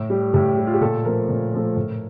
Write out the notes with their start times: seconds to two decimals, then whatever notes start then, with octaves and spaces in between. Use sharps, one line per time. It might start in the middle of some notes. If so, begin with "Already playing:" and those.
Already playing: A2
0.10 G3
0.33 A2 G4
0.57 G3
0.67 F4
0.74 G4
0.81 A#2 A4
1.05 F3 A3 A#4
1.28 A#2
1.53 F3 A3
1.76 A2